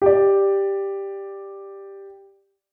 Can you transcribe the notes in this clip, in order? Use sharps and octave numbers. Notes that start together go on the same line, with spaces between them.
G4 D5